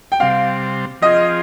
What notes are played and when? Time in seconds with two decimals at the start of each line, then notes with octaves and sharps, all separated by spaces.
0.12 G5
0.20 C3 G3 C4 F5
1.02 F3 C4 F4 G#4 D#5